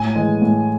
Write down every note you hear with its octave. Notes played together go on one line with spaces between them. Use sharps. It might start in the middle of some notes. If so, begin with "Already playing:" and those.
Already playing: A2 G#5
E3 G#3
A2